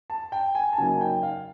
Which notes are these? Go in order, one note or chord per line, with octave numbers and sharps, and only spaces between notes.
A5
G5
G#5
A5
C#3 F#3 A#3 D#4 G#5
G5
F5